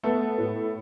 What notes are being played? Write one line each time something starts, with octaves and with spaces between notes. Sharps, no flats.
A3 B3 A4
A2